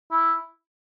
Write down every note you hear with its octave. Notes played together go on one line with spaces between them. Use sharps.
E4